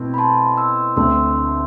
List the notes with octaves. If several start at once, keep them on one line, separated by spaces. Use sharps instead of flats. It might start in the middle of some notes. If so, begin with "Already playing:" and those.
Already playing: B2 A3 C4 E4
B5
A5 C6
C6 E6
D2 D3 A3 C4 C6 E6